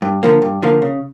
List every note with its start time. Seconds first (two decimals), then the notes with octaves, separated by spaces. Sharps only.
0.02 G2
0.23 D3 F3 A#3
0.42 G2
0.62 D3 F3 A#3
0.82 C#3